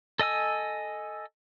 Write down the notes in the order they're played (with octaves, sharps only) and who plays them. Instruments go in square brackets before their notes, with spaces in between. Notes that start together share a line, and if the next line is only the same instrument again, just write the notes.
[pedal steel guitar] A4 D#5 G#5 E6